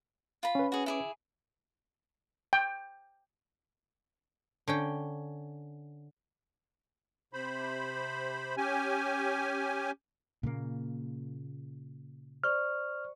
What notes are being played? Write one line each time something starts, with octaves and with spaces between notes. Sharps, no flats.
F4 B5
C#4 B4
F#4 G#4
E4 G#4 D6
G5
D3 C#4 G5
C3 C5 B5
C#4 G4 G#5
A#2 C#3 A#3
C5 D5 C#6 F6